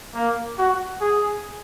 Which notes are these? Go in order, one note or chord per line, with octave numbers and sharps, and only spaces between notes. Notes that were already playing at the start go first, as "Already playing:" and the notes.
A#3
F#4
G#4